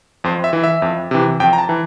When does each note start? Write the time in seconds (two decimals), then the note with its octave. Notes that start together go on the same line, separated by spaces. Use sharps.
0.24 F2 C5
0.44 E5
0.53 E3
0.64 E5
0.82 F2
1.11 C3 E3
1.40 F2 G5
1.53 A#5
1.58 A5
1.69 E3